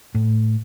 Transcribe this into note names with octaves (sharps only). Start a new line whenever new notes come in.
A2